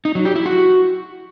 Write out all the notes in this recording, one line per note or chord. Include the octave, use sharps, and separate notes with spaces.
D#4
F#3
G4
E4
F#4